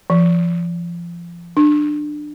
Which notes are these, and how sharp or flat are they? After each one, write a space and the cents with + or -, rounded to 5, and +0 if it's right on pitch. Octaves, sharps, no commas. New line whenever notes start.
F3 -30
D4 +20